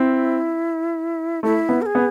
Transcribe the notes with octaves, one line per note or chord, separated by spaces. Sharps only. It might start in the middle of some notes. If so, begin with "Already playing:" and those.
Already playing: C4 E4
A3 E4
B3
A#4
G#4
B3